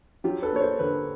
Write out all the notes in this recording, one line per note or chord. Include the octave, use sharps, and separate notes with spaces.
F#3 F4 G4
A4 B4
A#3 C#5
A#4 C5
D3 A4 B4